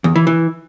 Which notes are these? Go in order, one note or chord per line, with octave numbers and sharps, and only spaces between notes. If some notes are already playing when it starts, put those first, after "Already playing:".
E2
E3
E3